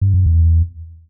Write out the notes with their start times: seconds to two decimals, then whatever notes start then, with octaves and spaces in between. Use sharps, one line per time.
0.01 G2
0.14 F#2
0.26 E2